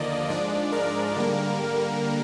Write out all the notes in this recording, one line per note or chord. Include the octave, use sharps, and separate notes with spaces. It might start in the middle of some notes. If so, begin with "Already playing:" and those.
Already playing: D#2 D3 F3 A#3 D5 D#5
G#2 F3 G#3 D4 D5
A#4
D3 G3 A#3